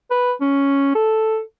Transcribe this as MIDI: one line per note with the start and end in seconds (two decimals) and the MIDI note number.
0.11 0.33 71
0.41 0.91 61
0.95 1.41 69